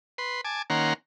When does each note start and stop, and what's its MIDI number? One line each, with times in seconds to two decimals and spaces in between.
0.18 0.41 71
0.18 0.41 84
0.45 0.62 80
0.45 0.62 81
0.45 0.62 86
0.70 0.93 51
0.70 0.93 58
0.70 0.93 61
0.70 0.93 78
0.70 0.93 82
0.70 0.93 84